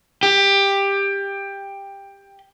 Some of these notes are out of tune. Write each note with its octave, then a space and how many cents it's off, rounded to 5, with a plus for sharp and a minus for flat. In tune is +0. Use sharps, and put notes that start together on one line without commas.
G4 +15